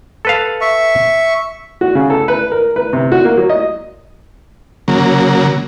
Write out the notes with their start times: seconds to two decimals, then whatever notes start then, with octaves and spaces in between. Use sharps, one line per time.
0.25 A4 B4 F5
0.61 E5 C#6
1.81 F#4
1.95 C#3
2.10 A4
2.28 B4
2.52 A#4
2.76 B4
2.93 C3
3.12 F#4
3.25 A#3
3.37 F#3
3.50 D#5
4.88 C#3 F#3 A#3